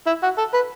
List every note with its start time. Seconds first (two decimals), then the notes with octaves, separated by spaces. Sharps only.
0.06 E4
0.23 F#4
0.38 A4
0.54 B4